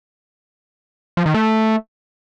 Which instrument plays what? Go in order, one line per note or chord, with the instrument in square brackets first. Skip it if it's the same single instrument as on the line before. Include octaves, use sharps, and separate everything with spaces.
[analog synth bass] F3
D#3
A3